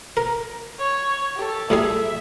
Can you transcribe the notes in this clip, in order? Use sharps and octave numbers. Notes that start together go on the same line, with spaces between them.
A#4
C#5
G4 A4
A2 G3 G#4 E5